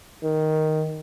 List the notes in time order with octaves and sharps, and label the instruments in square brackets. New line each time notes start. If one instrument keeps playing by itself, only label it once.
[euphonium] D#3